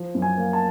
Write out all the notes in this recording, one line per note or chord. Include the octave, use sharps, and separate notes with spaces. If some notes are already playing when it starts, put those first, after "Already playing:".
Already playing: F3
F#2
G#5
A#3
A5